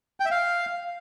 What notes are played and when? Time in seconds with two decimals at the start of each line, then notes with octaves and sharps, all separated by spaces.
0.20 G5
0.25 E5
0.31 F5